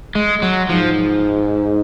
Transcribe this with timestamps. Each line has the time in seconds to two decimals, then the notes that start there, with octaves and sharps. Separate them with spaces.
0.15 G#3
0.42 F#3
0.69 G#2 F3